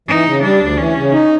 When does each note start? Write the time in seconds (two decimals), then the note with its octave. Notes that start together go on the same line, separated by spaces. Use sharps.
0.08 E3 D#4
0.25 C#3
0.43 G3 D4
0.60 D2
0.78 E3 C#4
0.96 C#3
1.12 D#4